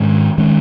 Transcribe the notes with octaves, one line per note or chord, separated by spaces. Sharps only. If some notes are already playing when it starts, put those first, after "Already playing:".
Already playing: G#2 D#3 G#3 C#4
D#3 G#3 C#4